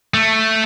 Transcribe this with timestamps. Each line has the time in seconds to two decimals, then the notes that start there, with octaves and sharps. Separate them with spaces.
0.14 A3